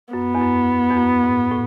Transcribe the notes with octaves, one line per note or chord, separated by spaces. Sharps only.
F#2 B3
E2
F#2
E2
F#2
G#2
A2